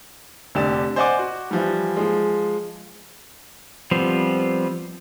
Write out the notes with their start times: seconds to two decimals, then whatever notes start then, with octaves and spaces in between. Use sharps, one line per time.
0.55 F1 D3 G4 D5 E7
0.96 C5 D5 D#5 F#5 G#5 D6
1.19 F#4
1.51 E3 F3 G3
1.97 F3 G#3
3.91 F3 G3 B3 C4